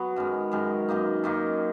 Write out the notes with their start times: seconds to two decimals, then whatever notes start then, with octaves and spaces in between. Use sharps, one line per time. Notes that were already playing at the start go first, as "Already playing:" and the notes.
Already playing: F#3 B3
0.16 F#2 D#3 G#3
0.52 F#2 D#3 G#3
0.89 F#2 D#3 A#3 D#4
1.24 F#2 D#3 A#3 D#4